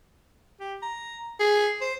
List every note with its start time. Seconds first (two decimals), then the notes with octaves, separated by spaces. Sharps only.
0.60 G4
0.83 A#5
1.40 G#4
1.81 C5